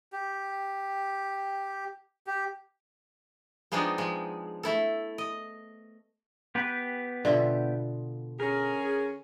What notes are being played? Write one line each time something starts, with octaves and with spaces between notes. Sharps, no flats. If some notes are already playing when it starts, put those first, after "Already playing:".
G4
G4
F3 G#3 B3 C4 D4 D#4
F3 G#3
A3 E4 A4
D#5
B3 G4 B4
B2 D3 F4 E5
C#4 G#4 A#4